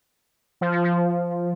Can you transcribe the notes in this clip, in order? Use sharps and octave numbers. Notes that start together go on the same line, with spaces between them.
F3
F3
F3